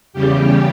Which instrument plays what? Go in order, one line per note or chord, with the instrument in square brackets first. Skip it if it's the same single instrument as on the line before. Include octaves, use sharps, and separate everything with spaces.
[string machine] E2 C#3 G3 G4